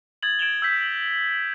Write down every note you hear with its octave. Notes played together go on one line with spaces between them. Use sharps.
D#6 G#6 A6 F#7
G#6 D7 E7 F7 G7
E6 G6 B6